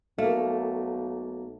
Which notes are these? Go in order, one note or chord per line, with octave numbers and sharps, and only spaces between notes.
B1 A3 A#3 F5